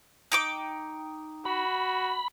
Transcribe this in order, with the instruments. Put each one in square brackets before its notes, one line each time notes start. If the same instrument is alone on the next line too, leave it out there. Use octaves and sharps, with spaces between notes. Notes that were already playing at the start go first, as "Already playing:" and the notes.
[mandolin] D#4 G5 D6
[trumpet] F#4 [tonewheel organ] B5